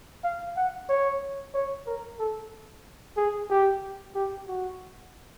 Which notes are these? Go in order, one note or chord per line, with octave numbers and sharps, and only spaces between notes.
F5
F#5
C#5
C#5
A#4
A4
G#4
G4
G4
F#4